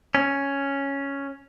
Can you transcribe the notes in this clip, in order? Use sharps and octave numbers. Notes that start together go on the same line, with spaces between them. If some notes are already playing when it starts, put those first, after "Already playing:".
C#4